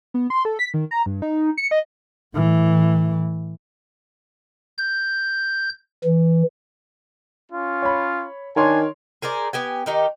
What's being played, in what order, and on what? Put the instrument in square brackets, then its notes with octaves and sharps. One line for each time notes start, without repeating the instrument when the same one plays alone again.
[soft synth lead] B3
C6
A4
B6
D#3
A#5
G2
D#4
C#7
D#5
[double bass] A2 E3
[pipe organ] G6
E3
[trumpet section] C#4 F4
[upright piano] C#5 B5
[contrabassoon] D#3 [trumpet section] D4 G#5 [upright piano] A#4 C#5 C6
[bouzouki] G#4 A#4 C5 D5
B3 G4 G#5
D#3 D#4 G4